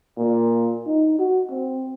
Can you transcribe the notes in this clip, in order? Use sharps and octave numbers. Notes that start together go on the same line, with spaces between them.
A#2
D#4
F#4
C4